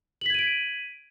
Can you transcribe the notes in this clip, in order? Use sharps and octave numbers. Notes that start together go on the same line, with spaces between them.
G#6 B6 D7 D#7 F#7